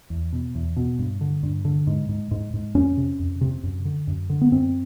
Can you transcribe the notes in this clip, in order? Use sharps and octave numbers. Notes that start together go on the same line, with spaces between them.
E2
B2
E2
B2
G2
D3
G2
D3
G#2
G#2
G#2
G#2
F2 C#4
C3
F2
C3
F#2
D3
F#2
D3
B3
F#2 C4